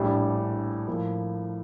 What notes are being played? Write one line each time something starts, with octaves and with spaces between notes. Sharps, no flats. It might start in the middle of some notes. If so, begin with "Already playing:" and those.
Already playing: A#1 A2 G3 D4 G4
A2 F3 A#3